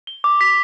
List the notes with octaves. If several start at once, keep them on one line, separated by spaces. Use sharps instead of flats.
G7
D6
B6